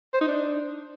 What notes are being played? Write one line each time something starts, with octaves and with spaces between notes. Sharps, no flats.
C5
D#4
D4